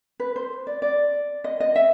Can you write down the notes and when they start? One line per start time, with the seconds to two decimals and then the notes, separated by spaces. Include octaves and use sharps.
0.20 B4
0.36 C5
0.67 D5
0.82 D5
1.44 D#5
1.60 D#5
1.76 E5